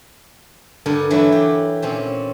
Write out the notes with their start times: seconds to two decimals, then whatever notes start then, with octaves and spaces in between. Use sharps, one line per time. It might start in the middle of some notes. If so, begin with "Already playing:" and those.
0.86 G2 D3 A4 A#4
1.10 E3 F#3 A3 E4
1.32 G4
1.82 A#2 C4 C#4